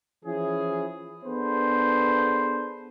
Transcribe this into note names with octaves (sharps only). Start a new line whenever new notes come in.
E3 F3 C#4 E4 G#4
B3 D4 G#4 A4 B4 C5